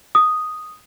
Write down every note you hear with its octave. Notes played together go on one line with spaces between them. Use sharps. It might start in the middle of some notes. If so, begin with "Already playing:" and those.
D#6